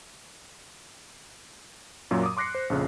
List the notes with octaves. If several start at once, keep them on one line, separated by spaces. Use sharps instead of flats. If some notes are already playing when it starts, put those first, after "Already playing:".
F#2 A#2 F#3
D6 D#6
C6 D6 F#6 A#6 C7 C#7
C5
A#1 F2 C#3